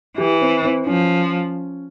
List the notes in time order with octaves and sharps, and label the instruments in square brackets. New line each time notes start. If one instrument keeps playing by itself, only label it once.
[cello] E3 [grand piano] G4
[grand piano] C4
C4
[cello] F3 [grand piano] C#4